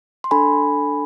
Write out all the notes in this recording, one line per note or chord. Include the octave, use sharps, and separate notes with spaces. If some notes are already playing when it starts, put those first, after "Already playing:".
C6
D4 A4 G#5 B5